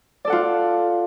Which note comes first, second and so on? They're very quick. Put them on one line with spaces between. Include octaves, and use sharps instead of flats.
D5 A4 F#5 F4